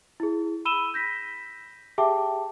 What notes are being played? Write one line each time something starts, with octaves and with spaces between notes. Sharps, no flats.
E4 G#4
B5 E6 D#7 E7 G7
G6 A#6 B6
G4 G#4 E5 G5 A5 D6